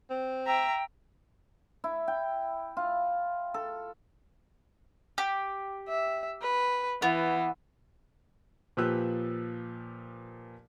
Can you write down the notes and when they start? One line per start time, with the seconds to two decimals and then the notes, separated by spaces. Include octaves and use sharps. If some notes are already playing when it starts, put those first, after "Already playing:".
0.10 C4
0.47 E5 G5 A#5
1.84 E4
2.08 G5
2.77 F4
3.54 A4
5.18 G4
5.88 E5
6.42 B4
7.02 E3 B3
8.77 A#2 F3 G4 B4 E6 F#6